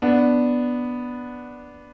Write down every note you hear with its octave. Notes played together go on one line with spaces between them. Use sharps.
B3 D4